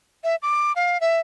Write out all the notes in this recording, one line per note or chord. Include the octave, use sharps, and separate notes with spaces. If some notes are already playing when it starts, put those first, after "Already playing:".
E5
D6
F5
E5